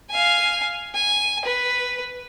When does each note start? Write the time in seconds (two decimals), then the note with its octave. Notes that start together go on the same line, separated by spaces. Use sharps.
0.10 F5 G#5
0.95 G#5
1.45 B4